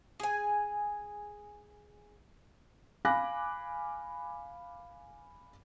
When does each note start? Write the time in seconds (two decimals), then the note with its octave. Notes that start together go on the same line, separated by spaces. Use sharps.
0.20 G#4 G#5
3.05 F5 G#5 B5 D6 F#6 A#6